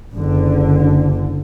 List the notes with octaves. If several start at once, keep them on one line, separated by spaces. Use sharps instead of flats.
F#1 D3